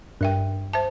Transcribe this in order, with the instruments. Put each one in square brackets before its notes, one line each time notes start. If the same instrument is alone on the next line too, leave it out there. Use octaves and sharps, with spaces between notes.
[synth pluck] G2 [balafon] A#4 E5 G5
[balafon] C5 E5 A5